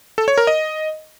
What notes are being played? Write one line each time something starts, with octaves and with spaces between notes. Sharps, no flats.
A4
C#5
A#4
D#5